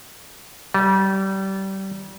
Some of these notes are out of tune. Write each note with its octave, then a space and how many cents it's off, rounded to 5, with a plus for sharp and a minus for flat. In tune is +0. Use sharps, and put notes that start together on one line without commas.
G3 -25